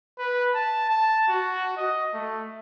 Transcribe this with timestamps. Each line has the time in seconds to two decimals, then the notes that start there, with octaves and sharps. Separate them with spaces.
0.19 B4
0.55 A5
0.90 A5
1.28 F#4
1.77 D#5
2.14 A3